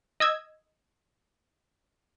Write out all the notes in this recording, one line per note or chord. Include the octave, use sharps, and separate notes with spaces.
D#5 E6 G#6